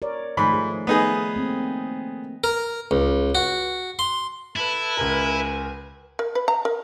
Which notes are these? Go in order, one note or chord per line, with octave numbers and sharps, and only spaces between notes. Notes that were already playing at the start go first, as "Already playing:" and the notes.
A#4 C#5 D5
G#2 D#3 F3 A3 B5
G#4
A3 B3 D#4 G#4
A#3 C4
A#4
C#2
F#4
C6
E4 A4 B4
C#2 A#4 G#5
A#4
B4
A#5
A#4